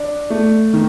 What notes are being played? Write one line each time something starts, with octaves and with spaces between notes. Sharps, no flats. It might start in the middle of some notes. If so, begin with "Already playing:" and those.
Already playing: D4
A3
D#3